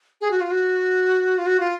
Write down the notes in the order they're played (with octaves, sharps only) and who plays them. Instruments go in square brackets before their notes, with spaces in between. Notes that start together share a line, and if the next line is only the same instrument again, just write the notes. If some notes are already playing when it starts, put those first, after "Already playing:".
[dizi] G#4
F#4
F4
F#4
F4
F#4
F4